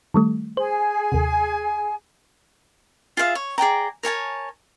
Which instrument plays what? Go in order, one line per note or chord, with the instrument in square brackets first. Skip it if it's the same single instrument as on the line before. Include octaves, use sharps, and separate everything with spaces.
[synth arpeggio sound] D#3 G3 A3
[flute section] G#4 G#5 [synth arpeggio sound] C5
[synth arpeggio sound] D#2 C3
[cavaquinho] F4 G#4 E5 F5
C#5
G#4 D5 G5 A#5
A#4 C#5 G#5 A5